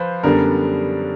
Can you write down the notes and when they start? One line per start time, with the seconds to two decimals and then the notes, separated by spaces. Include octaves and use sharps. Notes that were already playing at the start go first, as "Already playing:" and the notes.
Already playing: F3 B4 C5
0.23 F#2 D3 G3 B3 D4 A#4